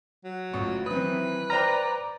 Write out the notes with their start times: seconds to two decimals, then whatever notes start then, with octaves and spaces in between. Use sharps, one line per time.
0.24 F#3
0.53 A1 D2 F4 C#6
0.86 D#3 E3 F#3 C4 B4 D#6
1.50 C5 D5 G5 A#5 F6